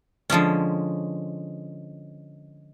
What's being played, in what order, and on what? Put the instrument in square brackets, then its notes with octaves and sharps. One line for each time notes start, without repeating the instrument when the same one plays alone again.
[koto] D3 F3 G#3 C#4